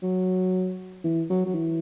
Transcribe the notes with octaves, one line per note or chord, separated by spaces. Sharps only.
F#3
E3
F#3
F#3
E3